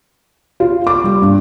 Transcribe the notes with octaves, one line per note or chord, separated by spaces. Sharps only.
F4
D6
G3
G2